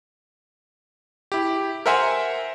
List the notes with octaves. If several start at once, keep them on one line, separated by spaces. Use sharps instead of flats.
E4 G4
A#4 C5 E5 F#5 G#5 C6